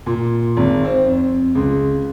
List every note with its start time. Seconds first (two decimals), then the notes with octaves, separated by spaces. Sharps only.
0.06 A#2
0.57 G#1
0.85 C4
1.06 F2
1.55 C#2